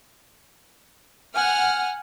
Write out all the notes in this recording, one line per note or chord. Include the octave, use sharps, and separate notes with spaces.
F#5 G#5 F6